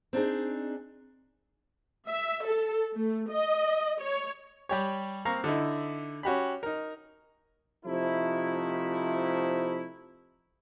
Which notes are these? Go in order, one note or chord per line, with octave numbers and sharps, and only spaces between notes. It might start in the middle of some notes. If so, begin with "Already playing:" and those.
C4 D4 D#4 G#4
E5
A4
A3
D#5
C#5
G3 G4 C#5
A#3 C4 F5 A#5 C#6
D3 D#4 E4
C#4 F#4 G4 B5
D#4 A#4
C3 F3 A3 D#4 E4